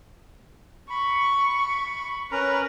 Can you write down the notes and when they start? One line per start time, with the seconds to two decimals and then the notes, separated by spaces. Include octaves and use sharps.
0.90 B5 C#6
2.31 C#4 A#4 B4 A#5